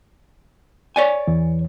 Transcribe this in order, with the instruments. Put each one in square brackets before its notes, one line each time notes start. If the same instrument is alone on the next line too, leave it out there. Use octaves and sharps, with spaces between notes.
[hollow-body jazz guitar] C#5 D5 G#5
[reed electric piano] E2 E3